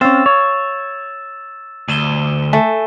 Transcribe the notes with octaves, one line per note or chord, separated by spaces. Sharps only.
C4 C#4 F5 E6 A6 E7
C#5
D2 D#7 E7 G7
A3 G#5 A5